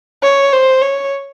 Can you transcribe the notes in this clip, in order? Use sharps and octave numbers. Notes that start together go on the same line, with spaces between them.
C#5
C5
C#5